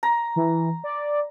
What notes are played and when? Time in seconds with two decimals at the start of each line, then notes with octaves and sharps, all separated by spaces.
0.03 A#5
0.36 E3
0.84 D5